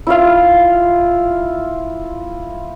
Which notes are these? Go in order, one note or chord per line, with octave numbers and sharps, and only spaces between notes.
E4 F4 F5